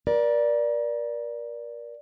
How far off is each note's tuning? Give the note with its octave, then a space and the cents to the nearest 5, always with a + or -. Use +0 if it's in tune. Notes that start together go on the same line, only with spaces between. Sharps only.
A#4 +30 D5 +0